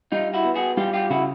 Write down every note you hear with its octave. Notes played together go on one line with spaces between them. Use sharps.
G3 D#4 F4
E4 F#4
B3
F#4 G#4
G3 F4 G4
F4 G4
C#3 E4 F#4